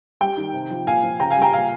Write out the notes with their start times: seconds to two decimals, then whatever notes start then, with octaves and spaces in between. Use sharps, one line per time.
0.21 G3 G5
0.37 D#3
0.53 C3
0.70 F3
0.87 A#2 F5 G#5
1.03 F3
1.20 C#3 G5 A#5
1.30 F5 G#5
1.36 G3
1.42 G5 A#5
1.53 A#2 F5 G#5